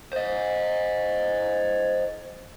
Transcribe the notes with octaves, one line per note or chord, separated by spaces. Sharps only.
C5 D#5